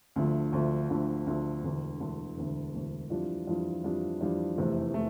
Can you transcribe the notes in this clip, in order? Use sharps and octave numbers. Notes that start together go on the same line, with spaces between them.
D2 D3 F3 A3
D2 D3 F3 A3
D2 D3 F3 A3
D2 D3 F3 A3
E1 D2 D3
E1 D2 D3
E1 D2 D3
E1 D2 D3
F2 E3 G3 D4 F4
F2 E3 G3 D4 F4
F2 E3 G3 D4 F4
F2 E3 G3 D4 F4
F1 E2 C3 E3 A3
E3 A3